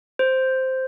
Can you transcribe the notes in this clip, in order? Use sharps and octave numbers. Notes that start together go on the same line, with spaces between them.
C5